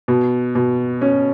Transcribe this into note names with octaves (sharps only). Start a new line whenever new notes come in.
B2
B2
C#4